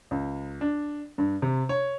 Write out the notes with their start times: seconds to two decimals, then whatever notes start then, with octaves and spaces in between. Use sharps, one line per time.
0.11 C#2
0.61 D4
1.18 G2
1.42 C3
1.69 C#5